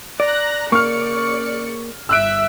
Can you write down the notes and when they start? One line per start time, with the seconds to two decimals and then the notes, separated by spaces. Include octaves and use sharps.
0.20 D5 A#5 F#6 A#6
0.72 C#3 A#3 D5 C#6 F6 C#7
2.09 G1 E5 E6 F#6 D7